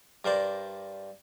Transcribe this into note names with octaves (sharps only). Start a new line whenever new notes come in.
G2 A#4 C5 D5